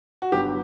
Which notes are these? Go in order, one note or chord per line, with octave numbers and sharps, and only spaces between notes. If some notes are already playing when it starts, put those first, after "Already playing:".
F#4
G1 G2 F#3 B3 G4